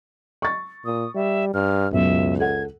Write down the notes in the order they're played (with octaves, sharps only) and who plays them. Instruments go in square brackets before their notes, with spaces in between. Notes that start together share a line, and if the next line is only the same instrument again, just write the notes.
[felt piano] C#6 A6
[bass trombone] A#2 [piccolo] D#6
[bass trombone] G3 [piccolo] E5
[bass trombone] G2 [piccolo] F6
[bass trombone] C#2 [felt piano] F#2 B2 [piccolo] E5
[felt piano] A4 F#5 [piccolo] G#6